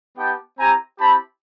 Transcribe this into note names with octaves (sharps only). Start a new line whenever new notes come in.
B3 D#4 G4 G5 A5
C4 E4 G4 G#5 A#5
C4 E4 G4 A5 B5